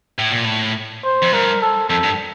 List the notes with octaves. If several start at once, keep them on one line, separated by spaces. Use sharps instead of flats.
A2
A#2
A2
C5
F2
G2 A#4
A4
F2 A4
G2